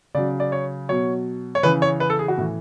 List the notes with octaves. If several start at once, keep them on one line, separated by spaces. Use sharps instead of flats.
C#3 F#3 D5
D5
C#5
B2 F#3 C#5
C#5
C#3 E3 B4
C#5
B4
A4
G#4
F#4
A2 E3